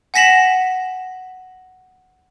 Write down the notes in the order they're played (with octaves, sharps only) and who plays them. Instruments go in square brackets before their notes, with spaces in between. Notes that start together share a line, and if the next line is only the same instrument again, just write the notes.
[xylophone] F#5 G#5 A#6 B6 E7 F#7